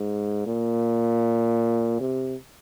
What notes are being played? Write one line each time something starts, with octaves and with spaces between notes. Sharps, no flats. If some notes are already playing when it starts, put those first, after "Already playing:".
Already playing: G#2
A#2
C3